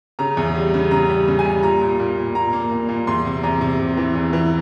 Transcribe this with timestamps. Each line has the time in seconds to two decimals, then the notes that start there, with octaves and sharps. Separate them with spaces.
0.19 C#3 A#5
0.37 E2
0.55 G3
0.74 C#3
0.91 C#3 A#5
1.09 G3
1.28 C#3
1.39 G#5
1.45 G3
1.63 A#2 A#5
1.81 A#2
1.99 A#2
2.17 A#2
2.35 A#2 A#5
2.53 A#3
2.71 A#2
2.89 A#2
3.07 E2 C6
3.25 C3
3.43 E2 A#5
3.61 C3
3.80 C3
3.97 E3
4.15 E2
4.33 E3